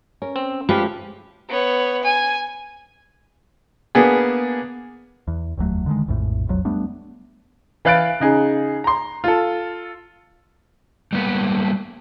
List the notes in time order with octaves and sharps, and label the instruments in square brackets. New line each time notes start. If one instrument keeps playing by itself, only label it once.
[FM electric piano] C#4 [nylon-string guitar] A#4
[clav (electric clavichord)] C4
[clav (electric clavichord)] F3 [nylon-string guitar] G#3 A3 C#4 [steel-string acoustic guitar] G4 [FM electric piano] B4 F5
[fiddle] B3 C#5
G#5
[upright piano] A#3 B3 D4 G#4
[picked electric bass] E2
F1 D#2 F#3 A3
D3 D#3 F#3 G#3
A#1 F2 A2
E1 B1 F2 F#3
G3 A3 B3 D4
[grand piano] E3 B4 F5 F#6 A6 D7
C#3 D#4 G#4
A#5 C6
F4 A4
[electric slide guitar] G3 A#3 B3 B4 F#5